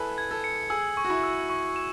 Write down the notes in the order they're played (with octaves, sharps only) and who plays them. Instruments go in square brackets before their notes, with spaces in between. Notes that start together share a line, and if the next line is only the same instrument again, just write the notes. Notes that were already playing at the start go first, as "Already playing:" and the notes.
Already playing: [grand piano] E4 G#4 A4 B4
[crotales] G#6
[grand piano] A4
[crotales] C#7
[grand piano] G#4 [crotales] E6
[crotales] C#6
[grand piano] F#4
E4
[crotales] E6
C#6
E7